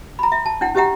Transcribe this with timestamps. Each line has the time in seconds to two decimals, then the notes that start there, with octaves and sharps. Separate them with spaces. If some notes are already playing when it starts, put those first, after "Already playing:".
0.19 A#5 B5
0.32 E5
0.46 A5
0.61 D4 E4 F#5
0.75 C#4 G4 B4 E5 F#5 A#5